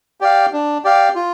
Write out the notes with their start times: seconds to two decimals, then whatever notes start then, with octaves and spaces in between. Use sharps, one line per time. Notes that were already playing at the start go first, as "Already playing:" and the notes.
0.21 G4 D5 F5
0.53 D4
0.84 G4 D5 F5
1.15 F4